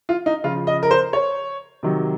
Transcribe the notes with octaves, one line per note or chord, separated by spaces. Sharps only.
F4
D#4
C#3 F3 F4
D#5
A#4
C5
C#5
C3 D#3 F#3